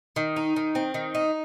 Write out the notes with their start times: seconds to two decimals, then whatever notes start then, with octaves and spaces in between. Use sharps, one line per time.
0.16 D#3
0.36 D#4
0.56 D#3
0.75 C4
0.94 D#3
1.15 D#4